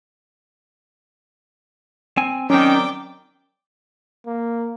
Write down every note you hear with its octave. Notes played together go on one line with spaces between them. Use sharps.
C4 G#5
D#3 F#3 C4 C#4 D5 G5 D6
A#3